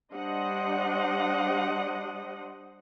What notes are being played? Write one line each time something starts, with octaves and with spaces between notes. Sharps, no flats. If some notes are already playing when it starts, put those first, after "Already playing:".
G3 D4 C5 D5 D#5 F#5